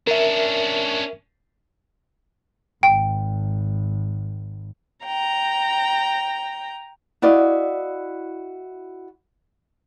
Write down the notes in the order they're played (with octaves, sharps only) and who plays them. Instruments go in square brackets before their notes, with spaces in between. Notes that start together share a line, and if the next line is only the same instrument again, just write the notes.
[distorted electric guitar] C#4 D4 [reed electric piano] A#4 E5
[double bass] G#1 [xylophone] G5
[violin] G5 A#5
[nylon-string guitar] E4 F#4 D5 D#5 F5